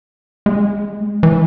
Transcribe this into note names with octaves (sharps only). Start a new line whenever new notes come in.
G#3
E3